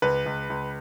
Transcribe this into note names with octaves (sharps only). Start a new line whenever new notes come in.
C#2 B4
C#2
C#2